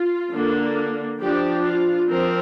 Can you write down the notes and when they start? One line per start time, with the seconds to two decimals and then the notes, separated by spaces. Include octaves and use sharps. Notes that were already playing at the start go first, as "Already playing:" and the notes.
Already playing: F4
0.30 D3 A#3 D4
1.20 F3 D4 G4
1.65 F4
2.09 F3 C4 A#4